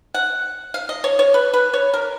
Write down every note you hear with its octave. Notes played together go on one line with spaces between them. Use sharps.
F#5
F5
D#5
C#5
C#5
B4
B4
C#5
A#4